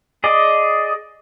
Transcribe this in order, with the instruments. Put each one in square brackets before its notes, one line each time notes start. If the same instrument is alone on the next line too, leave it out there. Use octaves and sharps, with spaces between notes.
[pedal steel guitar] G#4 D5 D#5